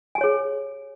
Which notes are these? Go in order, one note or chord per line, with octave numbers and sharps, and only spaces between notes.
G4 G#4 C#5 G#5